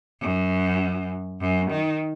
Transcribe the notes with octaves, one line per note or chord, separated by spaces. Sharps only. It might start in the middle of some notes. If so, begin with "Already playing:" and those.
F#2
F#2
D#3